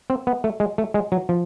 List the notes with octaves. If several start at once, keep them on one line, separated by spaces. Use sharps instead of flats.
C4
B3
A3
G#3
A3
G#3
F#3
F3